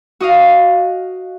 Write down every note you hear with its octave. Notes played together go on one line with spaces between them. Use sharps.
F#4 D#5 F5